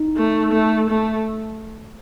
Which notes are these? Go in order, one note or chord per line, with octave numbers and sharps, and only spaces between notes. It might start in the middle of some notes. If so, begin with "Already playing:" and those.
Already playing: D#4
A3
A3
A3